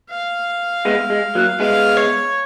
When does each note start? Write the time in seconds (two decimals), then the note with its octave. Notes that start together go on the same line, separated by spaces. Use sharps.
0.10 F5
0.85 G#3 B3
1.10 G#3
1.35 F#3 A#3
1.60 G#3 B3 F5
1.97 C#5